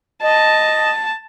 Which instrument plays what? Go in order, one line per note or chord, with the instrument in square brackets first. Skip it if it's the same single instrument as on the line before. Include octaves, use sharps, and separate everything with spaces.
[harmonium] D#5 [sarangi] A5